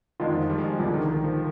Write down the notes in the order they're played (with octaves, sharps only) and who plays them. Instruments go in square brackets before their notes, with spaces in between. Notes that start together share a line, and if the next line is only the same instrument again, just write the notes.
[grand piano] F2 D3 G#3 D4 F4 [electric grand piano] D#3
[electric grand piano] F3
G3
G#3
G3
[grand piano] C2 A#2 F3 [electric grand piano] D3
[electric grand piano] D#3
D#3
F3